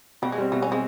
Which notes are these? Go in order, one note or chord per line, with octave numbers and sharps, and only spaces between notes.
B2 G3
G#3
G3 C4
B2 A3
C#4
G3 G#3 C4